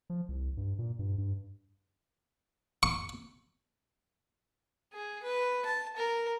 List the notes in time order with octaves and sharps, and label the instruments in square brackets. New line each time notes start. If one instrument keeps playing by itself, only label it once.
[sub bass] F3
C2
G2
A#2
G2
G2
[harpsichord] C#6
[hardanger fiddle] G#4
B4
A5
A#4